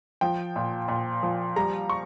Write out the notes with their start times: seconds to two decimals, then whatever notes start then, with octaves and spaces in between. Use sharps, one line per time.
0.21 F3 G5
0.56 A#2
0.88 A#2
1.23 F3
1.56 G3 A#5
1.89 C#6